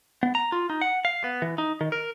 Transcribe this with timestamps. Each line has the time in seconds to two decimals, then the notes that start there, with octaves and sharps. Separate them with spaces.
0.23 B3
0.35 A#5
0.52 F4
0.70 D#4
0.82 F#5
1.05 F5
1.24 B3
1.42 E3
1.58 D#4
1.81 D#3
1.92 A#4